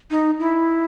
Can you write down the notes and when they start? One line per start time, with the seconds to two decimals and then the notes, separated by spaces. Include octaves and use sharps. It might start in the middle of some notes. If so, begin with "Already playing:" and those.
0.11 D#4
0.40 E4